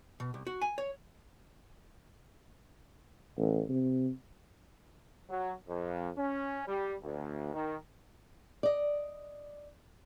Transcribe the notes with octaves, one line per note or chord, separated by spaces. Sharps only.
B2
C2
F#4
G#5
C#5
A1
C3
F#3
F2
C#4
G3
D2
D#3
D5 D#5